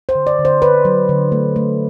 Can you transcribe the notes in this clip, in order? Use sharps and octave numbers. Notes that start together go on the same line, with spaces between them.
C5
D3
D5
D3
C5
D3 B4
F#3
D3
A3
A3